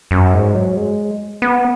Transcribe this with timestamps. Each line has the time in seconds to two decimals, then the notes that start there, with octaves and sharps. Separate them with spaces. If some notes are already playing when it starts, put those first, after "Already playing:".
0.11 F#2
0.33 G#2
0.55 F#3
0.77 G#3
1.42 B3